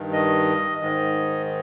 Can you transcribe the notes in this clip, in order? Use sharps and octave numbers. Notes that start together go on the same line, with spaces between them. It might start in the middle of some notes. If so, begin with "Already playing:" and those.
Already playing: G2 D#3
D#5
G#2 D#3 D#5